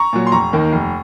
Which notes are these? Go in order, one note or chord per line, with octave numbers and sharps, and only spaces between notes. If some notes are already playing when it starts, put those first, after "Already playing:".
Already playing: A#5 C#6
A#2 F#3
C6
F1 A#5 C#6
D#2 D#3 A#3
F1